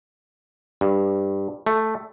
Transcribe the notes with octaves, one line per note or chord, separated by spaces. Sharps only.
G2
A3